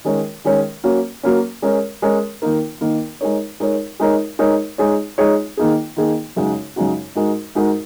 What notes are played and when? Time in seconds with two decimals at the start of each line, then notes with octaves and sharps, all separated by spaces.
0.04 D#3 G#3 C#4 A#4 C#5
0.45 D#3 G#3 C#4 A#4 C#5
0.84 F#3 A#3 C#4
1.23 F#3 A#3 C#4
1.62 G#3 C#4 A#4 C#5
2.02 G#3 C#4 A#4 C#5
2.42 D#3 A#3 D#4 A#4
2.81 D#3 A#3 D#4 A#4
3.21 G#3 D#4 A#4 C#5
3.60 G#3 D#4 A#4 C#5
4.00 G#3 D#4 A#4 C#5
4.39 G#3 D#4 A#4 C#5
4.78 G#3 D#4 G#4 C#5
5.18 G#3 D#4 G#4 C#5
5.57 D#3 A#3 D#4 G#4
5.97 D#3 A#3 D#4 G#4
6.36 F#2 C#3 G#3 D#4 F#4
6.76 F#2 C#3 G#3 D#4 F#4
7.15 G#2 G#3 D#4 F#4 A#4
7.55 G#2 G#3 D#4 F#4 A#4